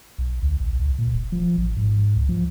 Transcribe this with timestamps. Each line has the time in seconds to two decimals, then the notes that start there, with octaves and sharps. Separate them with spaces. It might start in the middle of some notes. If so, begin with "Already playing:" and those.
0.18 B1
0.42 D2
0.60 A#1
0.79 C#2
0.98 A#2
1.14 E1
1.32 F3
1.58 A1
1.76 G#2
2.16 C#2
2.29 F3